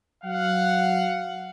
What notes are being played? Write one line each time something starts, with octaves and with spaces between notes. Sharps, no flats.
F#3 F5 F#5